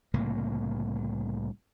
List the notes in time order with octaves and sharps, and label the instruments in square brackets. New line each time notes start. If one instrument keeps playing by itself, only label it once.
[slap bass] C2 A2 C#3 A#3